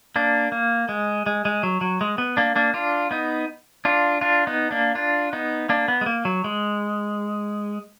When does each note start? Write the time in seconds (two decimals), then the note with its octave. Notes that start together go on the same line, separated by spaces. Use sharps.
0.16 A#3 D4
0.52 A#3
0.89 G#3
1.26 G#3
1.45 G#3
1.63 F#3
1.81 F#3
2.01 G#3
2.18 B3
2.37 A#3 D4
2.56 A#3 D4
2.74 D4 F4
3.11 B3 D#4
3.85 D4 F4
4.21 D4 F4
4.47 B3 D#4
4.71 A#3 D4
4.95 D4 F4
5.33 B3 D#4
5.69 A#3 D4
5.88 B3
6.01 G#3
6.06 A#3
6.25 F#3
6.44 G#3